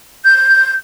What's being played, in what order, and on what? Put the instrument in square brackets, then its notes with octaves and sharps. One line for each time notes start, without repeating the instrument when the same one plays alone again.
[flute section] G6